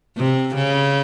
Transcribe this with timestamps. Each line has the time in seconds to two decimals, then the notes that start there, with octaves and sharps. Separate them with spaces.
0.17 C3
0.55 C#3